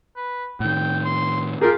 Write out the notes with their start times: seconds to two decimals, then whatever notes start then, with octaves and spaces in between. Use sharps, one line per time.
0.16 B4
0.60 A2 D#3 G5
1.05 C6
1.61 F4 G4 G#4 A#4